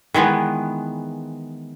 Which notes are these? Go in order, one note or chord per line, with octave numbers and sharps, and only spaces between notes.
D#3 E3 G#3 B3